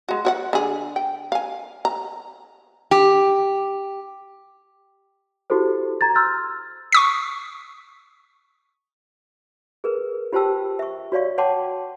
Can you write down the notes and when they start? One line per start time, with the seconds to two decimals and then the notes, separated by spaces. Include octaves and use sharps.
0.09 G#3 F#4
0.25 F#4 C#5 F#5
0.53 D3 G#4
0.96 G5
1.32 F5 G#5
1.85 A#5
2.91 G4
5.50 E4 F#4 G4 A4 C5
6.01 A#5 G#6 A6
6.15 C6 E6 F6 G6 A6
6.92 C#6 D#6 B6
9.84 G#4 A#4 B4
10.33 F4 G4 C5 G5 A5 E6
10.79 E5 C#6
11.12 F#4 C#5 D5 F5 C#6
11.38 C#5 F#5 G5 A5 C6 D6